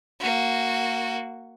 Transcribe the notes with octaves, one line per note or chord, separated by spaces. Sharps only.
A#3 F#4